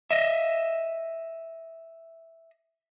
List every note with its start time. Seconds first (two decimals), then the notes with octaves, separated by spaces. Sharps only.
0.11 D#5 E5